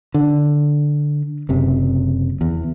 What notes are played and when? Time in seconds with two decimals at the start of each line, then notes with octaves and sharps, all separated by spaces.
0.14 D3
1.49 F#1 C3
2.41 E2